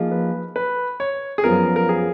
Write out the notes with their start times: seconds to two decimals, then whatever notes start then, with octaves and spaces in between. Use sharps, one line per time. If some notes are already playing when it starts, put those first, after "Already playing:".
Already playing: F3 A#3 D#4 G#4
0.11 B4
0.56 B4
1.00 C#5
1.38 G#4
1.44 F#2 F3 B3 F4 A#4
1.76 A#4
1.89 G#4